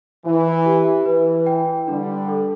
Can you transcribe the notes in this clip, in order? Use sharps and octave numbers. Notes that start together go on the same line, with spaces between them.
E3 E4
G4
E3 B4
G5
D3 G3 D4
A4